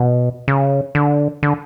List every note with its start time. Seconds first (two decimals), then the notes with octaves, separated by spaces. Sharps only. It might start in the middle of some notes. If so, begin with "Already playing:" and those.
Already playing: B2
0.48 C#3
0.95 D3
1.43 D3